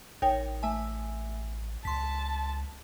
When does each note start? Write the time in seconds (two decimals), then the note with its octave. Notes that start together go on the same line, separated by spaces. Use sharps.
0.22 A1 D#4 A#4 C#5 G5
0.63 A3 E5 G#5
1.85 C#2 A5 C6 B6